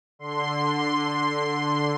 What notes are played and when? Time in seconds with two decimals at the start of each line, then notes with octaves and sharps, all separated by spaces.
0.19 D3 C6